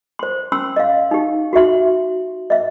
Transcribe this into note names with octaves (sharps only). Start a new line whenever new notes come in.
C5 C6
C#4 C6 E6
D#5 F5
D#4 G4
F#4 G4 E5 C6
D#5 E5